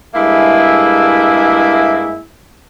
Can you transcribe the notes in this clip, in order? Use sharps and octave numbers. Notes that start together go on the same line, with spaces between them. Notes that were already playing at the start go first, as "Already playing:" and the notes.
G2 G#3 A#3 E4 G#4 E5